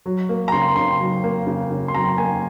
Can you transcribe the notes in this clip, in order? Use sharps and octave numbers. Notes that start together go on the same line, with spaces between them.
F#3
A#3
A#5
C#3 C6
C#3 C6
F#3
A#3
C#3
C#3
C6
F#3 A#5
A#3 G#5